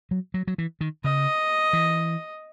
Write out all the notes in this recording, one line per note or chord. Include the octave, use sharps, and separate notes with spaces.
F#3
F#3
F#3
E3
D#3
C#3 D#5
E3